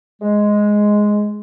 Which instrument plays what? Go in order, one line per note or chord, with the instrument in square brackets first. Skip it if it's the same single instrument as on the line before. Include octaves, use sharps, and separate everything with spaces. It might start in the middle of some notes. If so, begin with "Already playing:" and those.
[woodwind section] G#3